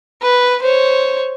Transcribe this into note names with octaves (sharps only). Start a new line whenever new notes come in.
B4
C5 C#5